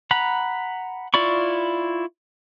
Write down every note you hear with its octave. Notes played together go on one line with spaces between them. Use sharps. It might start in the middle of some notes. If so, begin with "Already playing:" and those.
F#5 A#5 B5
E4 F4 D5 B5 C#6